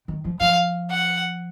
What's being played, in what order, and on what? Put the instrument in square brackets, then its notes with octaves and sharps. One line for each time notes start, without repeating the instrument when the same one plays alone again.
[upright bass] D#3
F3
[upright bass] F3 [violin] F5
[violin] F#5